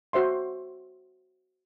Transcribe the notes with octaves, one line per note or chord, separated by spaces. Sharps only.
F#4 C5 E5 C6